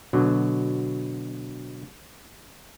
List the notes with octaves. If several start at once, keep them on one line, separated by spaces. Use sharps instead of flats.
B2 D3 F#3